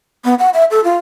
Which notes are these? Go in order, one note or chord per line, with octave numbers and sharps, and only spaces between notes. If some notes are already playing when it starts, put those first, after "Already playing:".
B3
F#5
E5
A4
F4